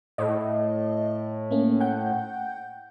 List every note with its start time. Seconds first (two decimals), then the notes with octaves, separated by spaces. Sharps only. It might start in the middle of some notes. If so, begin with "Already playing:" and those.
0.18 A2 D#5
1.51 A3 A#3 C#4
1.80 F#5 G5 G6